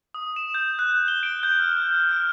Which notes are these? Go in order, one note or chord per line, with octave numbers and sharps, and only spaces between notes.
D#6
E7
G6
F#6
G7
D7
G6
F6
F6